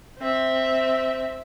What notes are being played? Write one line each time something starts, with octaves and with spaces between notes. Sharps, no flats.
C4 E5